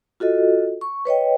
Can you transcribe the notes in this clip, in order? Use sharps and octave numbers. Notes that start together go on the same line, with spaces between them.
F4 F#4 A4 D#5
C#6
B4 C#5 D#5 G5